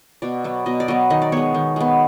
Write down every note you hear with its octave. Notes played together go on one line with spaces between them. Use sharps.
B2 D5
F#3 B3
B2 D#5
D5
F#3 B3 D#5
D#3 D#5
D5
G#3 B3 C#5
D#3
G#3 B3